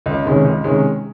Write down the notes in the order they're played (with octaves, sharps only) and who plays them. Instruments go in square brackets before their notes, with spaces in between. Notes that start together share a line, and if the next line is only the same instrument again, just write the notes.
[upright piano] C#2
C3 D#3 G#3 C#4
C#2
C3 D#3 G#3 C#4